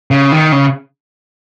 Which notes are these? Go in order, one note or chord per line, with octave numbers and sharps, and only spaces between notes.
C#3
D#3
C#3